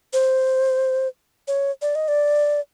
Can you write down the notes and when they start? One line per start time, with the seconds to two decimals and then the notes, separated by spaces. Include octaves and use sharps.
0.13 C5
1.48 C#5
1.82 D5
1.95 D#5
2.08 D5